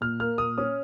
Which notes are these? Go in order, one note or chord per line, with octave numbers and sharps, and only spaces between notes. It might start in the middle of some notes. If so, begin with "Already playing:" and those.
A#2 F6
A#3 F6
A#2 D#6
C#4 D#6